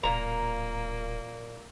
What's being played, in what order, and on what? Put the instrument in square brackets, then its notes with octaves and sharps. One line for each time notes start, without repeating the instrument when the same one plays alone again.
[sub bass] D1 [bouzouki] A#2 A#5 [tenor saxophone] A#3